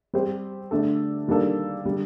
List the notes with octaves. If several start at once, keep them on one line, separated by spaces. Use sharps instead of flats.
G3 C4 G4 C5
D3 A3 D4 A4
D#3 G3 A#3 D4 A4
D3 G3